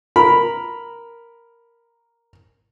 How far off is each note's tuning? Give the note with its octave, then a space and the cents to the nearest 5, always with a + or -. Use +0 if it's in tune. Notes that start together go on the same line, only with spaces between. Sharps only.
A#4 +0 B5 +0